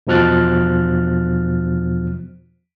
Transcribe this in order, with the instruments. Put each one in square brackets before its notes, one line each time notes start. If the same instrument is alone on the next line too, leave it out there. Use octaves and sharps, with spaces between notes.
[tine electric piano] E2 B2 F3 F6 F#6 A6